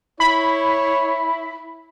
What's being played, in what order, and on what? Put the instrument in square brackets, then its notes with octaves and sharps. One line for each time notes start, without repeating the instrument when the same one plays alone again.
[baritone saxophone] E4 [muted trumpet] C#5 [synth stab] B5